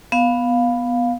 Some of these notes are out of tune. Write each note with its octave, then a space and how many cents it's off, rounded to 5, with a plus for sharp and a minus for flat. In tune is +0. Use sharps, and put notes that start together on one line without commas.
B3 +0 F5 +10